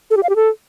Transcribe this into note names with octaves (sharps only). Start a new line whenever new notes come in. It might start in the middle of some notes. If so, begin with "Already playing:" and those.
A4
G4
F5
G4
A4